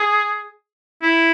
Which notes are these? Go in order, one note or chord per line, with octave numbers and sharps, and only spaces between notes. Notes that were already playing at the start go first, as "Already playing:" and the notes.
Already playing: G#4
E4